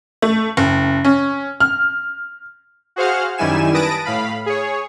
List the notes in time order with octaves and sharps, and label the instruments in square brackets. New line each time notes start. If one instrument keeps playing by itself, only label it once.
[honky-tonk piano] A3
F#1
C#4
F6
[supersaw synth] F#4 G#4 C5 F5 F#5 F6
F#2 D#3 G3 E4 G#5 E7
B4 A5 D#6 A#6 D7
A2 F5 B5
G#4 C#5